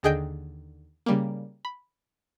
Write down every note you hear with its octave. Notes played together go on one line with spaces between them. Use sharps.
D#2 D3 G#4 D#5 G5 G6
C#3 G3 A#3
B5